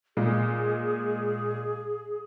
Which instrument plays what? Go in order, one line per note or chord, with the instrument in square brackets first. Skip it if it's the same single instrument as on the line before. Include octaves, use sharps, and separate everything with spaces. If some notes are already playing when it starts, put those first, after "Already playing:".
[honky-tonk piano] A#2 G#3 [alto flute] G#4